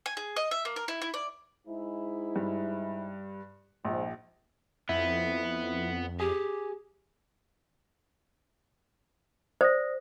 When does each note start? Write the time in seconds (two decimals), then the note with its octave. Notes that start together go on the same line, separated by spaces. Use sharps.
0.06 G#5
0.17 G#4
0.36 D#5
0.51 E5
0.65 A#3
0.76 A#4
0.88 E4
1.02 E4
1.14 D5
1.67 G#2 G#3 E4
2.36 G2
3.84 A#1 G#2 F3
4.89 F2 B3 E4
6.20 G4 G#4 G#5
9.61 C5 D5 D#6 A#6